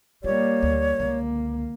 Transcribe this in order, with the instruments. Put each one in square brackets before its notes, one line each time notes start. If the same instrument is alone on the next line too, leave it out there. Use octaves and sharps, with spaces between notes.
[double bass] G3 A#3 [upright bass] F4 [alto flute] C#5
[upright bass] D2
[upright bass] C#2 D3 [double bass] A#3